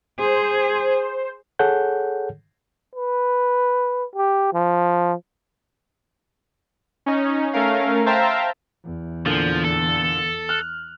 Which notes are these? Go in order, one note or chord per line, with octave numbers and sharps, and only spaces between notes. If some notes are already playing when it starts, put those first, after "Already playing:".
G#4 C5
G#4 A4 C#5 F#5 G6
B4
G4
F3
C#4 D#4
A3 C#4 A#4 F5
C5 E5 F5 G5 A5 A#5
E2
A#2 D3 F3
A4
F6 F#6